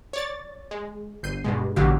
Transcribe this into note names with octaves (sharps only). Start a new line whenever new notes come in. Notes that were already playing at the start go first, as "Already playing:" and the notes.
C#5 D5 A6
G#3
G1 G6 C7 D#7
G2 B2 G#3
A1 B2 D3 F#3 G4 F5